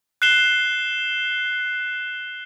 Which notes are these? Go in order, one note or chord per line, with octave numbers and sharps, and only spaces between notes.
F#6 C7 E7 G7